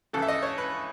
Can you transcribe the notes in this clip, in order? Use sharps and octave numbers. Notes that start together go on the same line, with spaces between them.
C#2 C#3 E3 A4
E5
D#5
C#5
B4